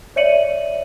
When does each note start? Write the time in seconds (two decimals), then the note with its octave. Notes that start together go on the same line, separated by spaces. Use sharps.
0.16 C#5 D5 E5 C#7 D#7 F#7